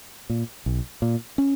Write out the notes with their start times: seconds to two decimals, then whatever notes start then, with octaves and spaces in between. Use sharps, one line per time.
0.30 A#2
0.66 B1
1.02 A#2
1.38 C#4